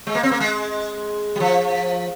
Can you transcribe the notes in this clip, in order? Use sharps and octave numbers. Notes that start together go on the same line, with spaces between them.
G#3
A#3
C4
A#3
G#3
G3
F3